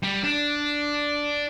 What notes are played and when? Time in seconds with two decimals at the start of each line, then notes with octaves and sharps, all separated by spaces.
0.03 G3
0.24 D4